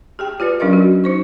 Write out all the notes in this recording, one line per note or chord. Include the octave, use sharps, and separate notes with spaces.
G4 G#4 G5
F4 G4 B4 D5
F#3 C#4 D4 A#4 D5 D#5
F#4
D#4 C5 C#6